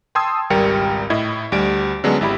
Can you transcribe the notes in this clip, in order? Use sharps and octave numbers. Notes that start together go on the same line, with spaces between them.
G5 A5 C6 D#6 E6 G#6
G#1 C#2 G3 A#4 G5 C#7
A2 E4 D#5 G#6
D2 G3 D7
D3 F#3 G#3 B3 C#4 D4
G#1 E4 G4 B5